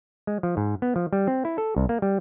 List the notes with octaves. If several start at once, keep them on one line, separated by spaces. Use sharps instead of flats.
G#3
F3
G#2
B3
F3
G3
C4
E4
A4
C2
A#3
G3